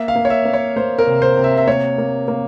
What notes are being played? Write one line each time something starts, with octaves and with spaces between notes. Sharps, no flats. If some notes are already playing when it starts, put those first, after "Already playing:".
Already playing: A#3 E5
F5
A#3
C#5
E5
A#3
C#5
A#3 C5
A#4
C3
C5
C3
E5
E5
A#3 C#5
A#3
A#3